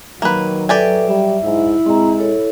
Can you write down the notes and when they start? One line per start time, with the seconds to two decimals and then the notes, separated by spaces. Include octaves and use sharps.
0.22 D#3 F#3 A#3 B4
0.69 G4 A4 B4 D5 E5 G#5
1.08 G3 E5
1.44 G#2 E4
1.86 G#3 C4 A#5
2.18 A4 C#5